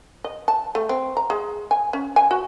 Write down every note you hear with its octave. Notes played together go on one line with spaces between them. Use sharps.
D#5
A5
A3
C4
A#5
G#3
G#5
C#4
G#5
F#4